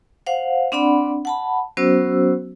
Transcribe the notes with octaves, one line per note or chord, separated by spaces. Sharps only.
C5 F5 F#5
C4 D4 D5 F#5 B5
F#5 A5 B5
F#3 B3 C#4 F#4 C5 E6